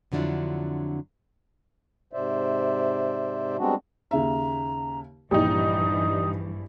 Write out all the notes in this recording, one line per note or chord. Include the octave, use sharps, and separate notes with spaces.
F2 D3 F#3 D4 E4 F4
G#2 C3 C5 D5 E5
G3 G#3 B3 C4 D4 F#4
D#2 C#3 E5 A#5
A#1 G2 E3 G3 D#4 E4 G5 D#6